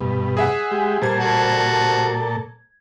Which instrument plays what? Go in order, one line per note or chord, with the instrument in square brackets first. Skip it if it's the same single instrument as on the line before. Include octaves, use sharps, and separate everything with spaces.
[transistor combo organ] G2 B2
[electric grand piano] G#4 E5 F#5
[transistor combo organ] G#3 G4
[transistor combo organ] A#2 A4 [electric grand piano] G3 C5 G#6
[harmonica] F#4 A5